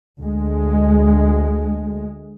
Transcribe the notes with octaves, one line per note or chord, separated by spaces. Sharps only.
D2 G#3